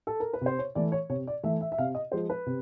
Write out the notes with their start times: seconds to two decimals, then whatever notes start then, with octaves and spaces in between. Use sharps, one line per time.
0.07 A4
0.20 A#4
0.33 B4
0.41 C3 C5
0.58 C#5
0.75 E3 A3 D5
0.92 C#5
1.09 C3 C#5
1.27 D5
1.43 E3 A3 E5
1.61 E5
1.72 E5
1.78 C3 F5
1.95 D#5
2.12 F3 G#3 C5
2.30 B4
2.46 C3